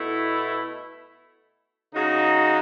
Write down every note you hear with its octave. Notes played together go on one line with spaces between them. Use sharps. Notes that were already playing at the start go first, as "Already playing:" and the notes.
Already playing: B2 A3 E4
C#3 G#3 D#4 F#4